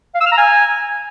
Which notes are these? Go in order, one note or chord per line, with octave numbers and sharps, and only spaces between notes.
F5
E6
F6
A#5
G#5